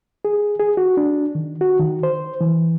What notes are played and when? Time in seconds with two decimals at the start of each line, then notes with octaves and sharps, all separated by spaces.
0.25 G#4
0.60 G#4
0.77 F#4
0.97 D4
1.35 D#3
1.61 F#4
1.79 D#3
2.03 C5
2.41 E3